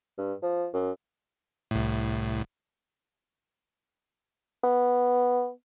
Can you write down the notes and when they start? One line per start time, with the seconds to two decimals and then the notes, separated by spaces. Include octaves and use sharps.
0.18 G2
0.42 F3
0.74 F#2
1.71 C2 A2
4.64 B3